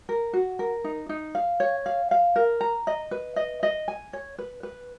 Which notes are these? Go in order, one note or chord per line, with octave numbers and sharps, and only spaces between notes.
A#4
F#4
A#4
D#4
D#4
F5
C#5
F5
F5
A#4
A#5
D#5
B4
D#5
D#5
G#5
C#5
B4
B4